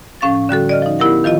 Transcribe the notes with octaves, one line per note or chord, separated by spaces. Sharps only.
A2 F3 C#4 F5 C#6 A6
D3 G3 F#4 A4
D5 D#5 F6
F3 D#4
B3 E4 G4 A#4 F#5
D#3 F3 F4 D#5